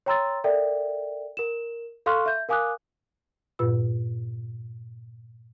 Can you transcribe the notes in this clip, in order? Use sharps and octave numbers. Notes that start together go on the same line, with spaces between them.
C#5 G5 A#5 C6 E6 A6
A4 A#4 D5 E5 G5
A#4 E7
A4 F5 C6 C#6 F6 F#6
E5 G6
A#4 F5 G#5 D6 D#6 F#6
G2 A#2 F4 B4 E6